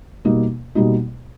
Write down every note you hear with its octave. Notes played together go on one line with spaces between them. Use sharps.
B2 G3 A#3 D#4
B2 G3 A#3 D#4